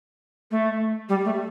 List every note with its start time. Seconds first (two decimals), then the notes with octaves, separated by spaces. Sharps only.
0.51 A3
1.09 G3
1.25 A3